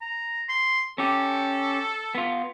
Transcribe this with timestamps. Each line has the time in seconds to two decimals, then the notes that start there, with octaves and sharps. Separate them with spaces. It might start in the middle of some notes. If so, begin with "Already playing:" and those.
0.02 A#5
0.49 C6
0.98 C#4 G4 A4
2.15 B3 F4